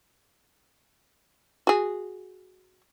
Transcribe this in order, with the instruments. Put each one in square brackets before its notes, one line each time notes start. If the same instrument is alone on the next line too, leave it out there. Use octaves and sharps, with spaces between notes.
[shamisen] F#4 G#4